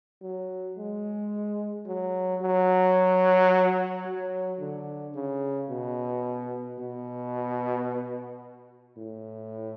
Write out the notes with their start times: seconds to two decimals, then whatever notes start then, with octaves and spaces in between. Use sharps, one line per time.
0.22 F#3
0.78 G#3
1.86 F#3
2.41 F#3
4.05 F#3
4.59 D3
5.15 C#3
5.69 B2
6.79 B2
8.97 A2